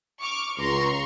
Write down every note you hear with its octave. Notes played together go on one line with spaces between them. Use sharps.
C#6 D6 F6
C#2 A#5 C6 C#6